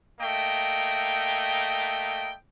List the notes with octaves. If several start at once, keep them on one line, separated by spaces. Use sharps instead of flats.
A3 A#3 D#5 G5